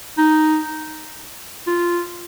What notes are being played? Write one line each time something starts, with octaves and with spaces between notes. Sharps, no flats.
D#4
F4